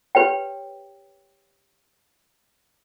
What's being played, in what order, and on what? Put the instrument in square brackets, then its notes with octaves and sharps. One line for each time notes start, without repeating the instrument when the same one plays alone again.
[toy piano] G4 B4 C#5 G5